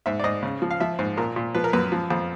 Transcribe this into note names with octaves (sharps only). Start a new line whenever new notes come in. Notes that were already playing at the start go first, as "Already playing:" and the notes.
G#2 E5
D5
G#2 D#5
C#3
F3
F5
F3 E5
G#2
A#2 A#4
A#2
F3 B4
A#4
F#2 B4
F3
F2